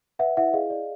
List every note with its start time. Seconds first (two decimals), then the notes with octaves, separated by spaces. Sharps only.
0.19 B4 E5 F#5
0.37 E4 E5 F#5
0.53 G#4 D#5 F5
0.70 D5